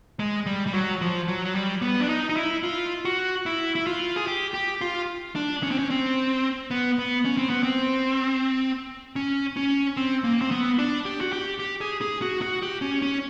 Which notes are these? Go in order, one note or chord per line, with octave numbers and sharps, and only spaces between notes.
G#3
G3
G3
F#3
F3
F#3
F#3
G3
B3
D4
D#4
D#4
E4
F4
F#4
E4
E4
F4
G#4
G4
G4
F4
D4
C#4
C4
C#4
C4
B3
B3
C#4
C4
B3
C4
C#4
C#4
C4
A#3
C4
B3
D4
G4
F#4
G4
G4
G#4
G#4
F#4
F#4
G4
C#4
C#4